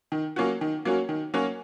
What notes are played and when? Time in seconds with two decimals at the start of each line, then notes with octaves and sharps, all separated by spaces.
0.12 D#3
0.36 F#3 A#3 C#4 F#4
0.61 D#3
0.85 F#3 A#3 C#4 F#4
1.09 D#3
1.34 F#3 A#3 C#4 F#4